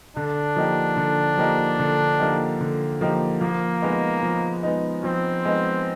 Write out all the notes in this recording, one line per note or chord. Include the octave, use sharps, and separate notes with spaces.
D3 D4
F3 A#3 D#4 G4
D3
F3 A#3 D#4 G4
D3
F3 A#3 D#4 G4
D3
F3 A#3 D#4 G4
F3 A#3
G#3 B3 D#4
F3
G#3 B3 D#4
F3 C4
G#3 B3 D#4